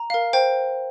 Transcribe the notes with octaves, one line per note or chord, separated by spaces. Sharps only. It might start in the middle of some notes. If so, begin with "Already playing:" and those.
Already playing: A#5
A#4 F5
C5 G5